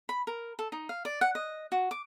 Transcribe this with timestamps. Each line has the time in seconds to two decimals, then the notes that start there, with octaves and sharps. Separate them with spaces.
0.09 B5
0.27 A#4
0.59 A4
0.72 D#4
0.89 F5
1.05 D5
1.21 F#5
1.35 D#5
1.72 F#4
1.91 D6